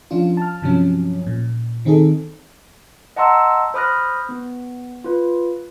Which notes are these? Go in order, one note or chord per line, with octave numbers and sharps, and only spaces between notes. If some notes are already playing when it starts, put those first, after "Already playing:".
F3 C#4 D4 F4
A5 F6
G2 C3 F3 F#3 C#4
A#2
D#3 C4 D#4 G#4 A4
D#5 F#5 A5 A#5 C6 E6
C5 B5 D#6 F6 F#6 A#6
B3
F4 B4